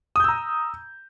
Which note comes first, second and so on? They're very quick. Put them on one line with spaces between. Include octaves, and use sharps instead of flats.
D#6 G6 E6 A#5